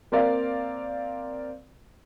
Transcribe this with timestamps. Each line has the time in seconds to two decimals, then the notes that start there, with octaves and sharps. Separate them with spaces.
0.12 A#3 C4 A#4 D5 F5